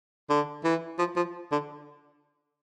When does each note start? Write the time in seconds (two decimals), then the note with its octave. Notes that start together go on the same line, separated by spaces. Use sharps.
0.30 D3
0.64 E3
0.99 F3
1.16 F3
1.52 D3